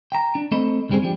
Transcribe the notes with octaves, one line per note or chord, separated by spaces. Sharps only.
G5 A#5
D4
A3 C4 A4 D#5 B5
C#2 G2 G3 G#3 C4 G#4
F3 D4 G4